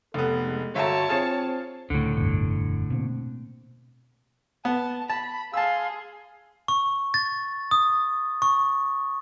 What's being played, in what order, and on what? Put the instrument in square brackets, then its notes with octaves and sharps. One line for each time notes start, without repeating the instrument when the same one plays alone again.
[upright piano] F1 B3 [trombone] A4
[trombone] G#3
[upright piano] G1 E5 A#5 [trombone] F#4 [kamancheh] C#5 A5
[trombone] C4 [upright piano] F4 G#4 A6
[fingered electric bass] C#2 [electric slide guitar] A2 D3
[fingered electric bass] F1 G2 B2
B2 A#3 C4
[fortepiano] B3 [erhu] A5
[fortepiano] A5 [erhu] B5
[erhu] G#4 [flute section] F5 C6 [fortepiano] A5 E6
[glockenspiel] C#6
A6
D#6
C#6